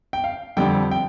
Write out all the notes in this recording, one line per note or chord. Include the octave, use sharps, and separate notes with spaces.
G5
F5
F2 D3 G3 G5
G5